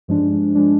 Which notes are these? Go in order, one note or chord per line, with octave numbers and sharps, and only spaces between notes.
G2 F3 G#3 D4
F3 G#3 D4